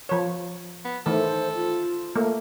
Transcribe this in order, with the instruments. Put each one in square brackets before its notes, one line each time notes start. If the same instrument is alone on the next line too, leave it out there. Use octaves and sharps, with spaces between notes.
[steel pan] F3 C#5
[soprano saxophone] B3
[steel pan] D#3 E3 A3 [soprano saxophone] A4 [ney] C5
[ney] F4
[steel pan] A3 A#3